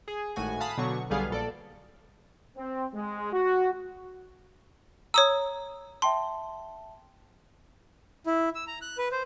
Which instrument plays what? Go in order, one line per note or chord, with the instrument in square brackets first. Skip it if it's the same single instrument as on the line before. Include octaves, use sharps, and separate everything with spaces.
[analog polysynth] G#4
G#1 A2 F#4 G#5
F5 A5 B5 D#6
B2 D3 F#3 C#6
B1 D3 G3 B3 G#4 F5
A#1 A4 D5
[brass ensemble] C4
G#3
F#4
[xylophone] C#5 D#6 E6 [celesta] A#5
[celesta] E5 G5 A5 [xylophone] C6
[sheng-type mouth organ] E4
E6
A#5
F#6
B4
C5